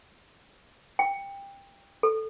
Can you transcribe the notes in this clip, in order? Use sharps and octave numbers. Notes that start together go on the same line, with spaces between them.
G5
A4